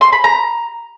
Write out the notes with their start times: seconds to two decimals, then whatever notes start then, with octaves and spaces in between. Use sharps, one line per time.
0.01 C6
0.12 B5
0.24 A#5